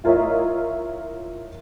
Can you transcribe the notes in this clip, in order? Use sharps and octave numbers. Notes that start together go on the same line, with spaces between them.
E4 F4 A#4 C#5 D#5 E5